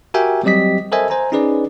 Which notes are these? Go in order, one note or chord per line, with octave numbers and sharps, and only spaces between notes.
F#4 G4 A#4 E5 G5 G#5
F#3 G3 C4 G4 D#5 B6
A4 A#4 C5 D#5 E5 G#5
C5 G#5 A#5
C#4 D#4 G#4 B4 D5